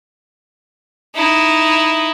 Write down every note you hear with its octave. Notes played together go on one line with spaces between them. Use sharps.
D#4 E4